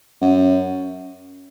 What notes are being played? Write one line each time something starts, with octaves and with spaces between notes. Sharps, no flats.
F#2